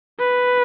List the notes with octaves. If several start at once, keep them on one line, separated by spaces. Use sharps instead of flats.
B4